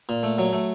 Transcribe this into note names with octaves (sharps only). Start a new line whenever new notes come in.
A#2
A3
F#3
A3